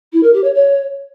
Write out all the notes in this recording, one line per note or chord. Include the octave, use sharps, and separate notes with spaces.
E4
A#4
G4
C#5
C#5